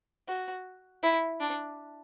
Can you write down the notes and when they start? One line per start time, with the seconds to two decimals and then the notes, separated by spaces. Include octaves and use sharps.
0.28 F#4
1.03 E4
1.40 D4